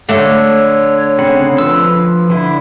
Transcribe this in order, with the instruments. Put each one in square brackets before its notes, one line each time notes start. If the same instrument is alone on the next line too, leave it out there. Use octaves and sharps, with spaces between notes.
[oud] D3 A3 [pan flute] C#5
[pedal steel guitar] C#3 C4 F#5
F3 B4 E6
D3 E4